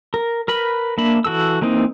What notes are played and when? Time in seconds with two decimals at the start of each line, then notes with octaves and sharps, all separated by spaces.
0.14 A#4
0.48 A#4 B4 B5
0.98 A#3 D4 E5 B5
1.24 E3 F#4 A4 E6
1.61 E3 A#3 C4 D#4